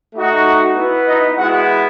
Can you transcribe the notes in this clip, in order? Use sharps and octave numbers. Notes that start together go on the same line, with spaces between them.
A3 D#4 F#4
B3 E4
D#4 D#5
G#3 B3 E4 F#4 F#5